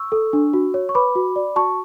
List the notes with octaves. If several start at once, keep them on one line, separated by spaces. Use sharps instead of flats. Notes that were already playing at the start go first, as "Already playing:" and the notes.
Already playing: C#6 E6
A4
D4
F#4
C#5
C#6
B4 B5 D6
F#4
D5
F#4 A5 C#6